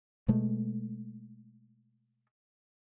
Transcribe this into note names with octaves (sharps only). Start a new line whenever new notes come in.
B2 G#3 A3